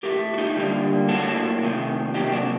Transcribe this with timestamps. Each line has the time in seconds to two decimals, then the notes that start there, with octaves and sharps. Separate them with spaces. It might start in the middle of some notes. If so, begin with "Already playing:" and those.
0.03 A2 A3 G4 A#4
0.33 F#4
0.38 D#4 G4
0.56 D3 G3 A#3
1.08 A2 F#3 A#3 F#4 A4
1.62 C3 D#3 A3
2.14 C3 F#3 A#3 D#4 G4
2.32 D4 F#4